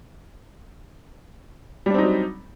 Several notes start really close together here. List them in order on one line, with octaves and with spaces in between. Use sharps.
G3 D4 C4 D#4 F#3